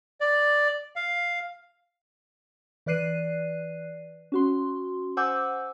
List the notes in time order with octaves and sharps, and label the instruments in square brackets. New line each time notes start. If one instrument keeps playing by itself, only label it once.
[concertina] D5
F5
[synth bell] E3 B4 D5 F#6 C7 D#7
C#4 F#4 C6
C5 F#5 G#5 D6 E6 G6